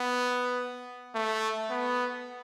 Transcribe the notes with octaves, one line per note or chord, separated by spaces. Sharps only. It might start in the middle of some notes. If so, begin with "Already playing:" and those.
Already playing: B3
A3
B3